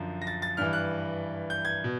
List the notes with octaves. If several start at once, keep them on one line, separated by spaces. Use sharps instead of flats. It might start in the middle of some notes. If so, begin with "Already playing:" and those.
Already playing: F#2 D3 F3
A#6
A6
A6
G2 E3 F6
F#6
G6
G#6
B2